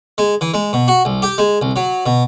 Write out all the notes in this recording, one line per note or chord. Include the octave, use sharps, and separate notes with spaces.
G#3
E3
G#3
B2
F#4
C2
G4
G#3
C2
F#3
B2